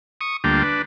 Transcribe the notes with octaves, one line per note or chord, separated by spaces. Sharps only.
C#6 D#6
D2 G3 A#3 D4 F4 G5
D4 B4